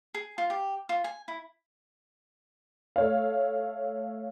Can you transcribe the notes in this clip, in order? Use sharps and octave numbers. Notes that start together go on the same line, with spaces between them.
G#4
F4
G4
F4
G#5
E4
A3 C#5 F5